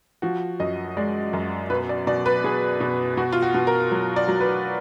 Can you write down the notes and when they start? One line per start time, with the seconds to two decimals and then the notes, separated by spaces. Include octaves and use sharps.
0.22 F3 F#4
0.60 F#2 D#5
0.97 G#3 D5
1.33 F#2
1.70 B2 B4
1.89 D5
2.07 B2 D5
2.26 B4
2.44 B2 G#4
2.81 B2
3.17 B2 F#4
3.33 F4
3.42 F#4
3.54 B2
3.67 A#4
3.92 F#3
4.16 D5
4.28 F#3
4.40 B4